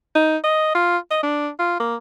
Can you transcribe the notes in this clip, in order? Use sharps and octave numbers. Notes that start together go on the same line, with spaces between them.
D#4
D#5
F4
D#5
D4
F4
A#3